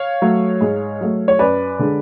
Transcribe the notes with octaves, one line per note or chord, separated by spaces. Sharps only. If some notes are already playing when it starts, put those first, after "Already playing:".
Already playing: C#5 F5
F#3 A3
G#2
F#3 A3
C#5
F#2 B4 D5
D3 G#3